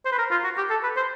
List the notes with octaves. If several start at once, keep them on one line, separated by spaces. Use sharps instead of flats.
C5
B4
A#4
F4
F#4
G4
A4
B4
C5